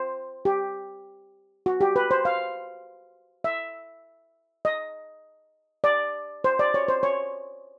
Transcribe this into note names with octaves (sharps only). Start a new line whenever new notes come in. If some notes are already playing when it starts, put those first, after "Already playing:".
Already playing: C5
G4
F#4
G4
B4
C5
F5
E5
D#5
D5
C5
D5
C#5
C5
C#5